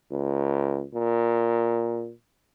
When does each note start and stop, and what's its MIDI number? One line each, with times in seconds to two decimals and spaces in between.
0.11 0.83 37
0.94 2.11 46